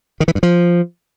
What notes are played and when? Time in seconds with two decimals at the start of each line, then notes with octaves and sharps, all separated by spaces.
0.20 D#3
0.28 E3
0.35 G2
0.43 F3